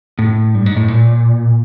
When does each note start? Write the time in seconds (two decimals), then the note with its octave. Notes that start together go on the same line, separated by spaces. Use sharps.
0.19 A2
0.55 G2
0.66 G#2
0.76 A2
0.88 A#2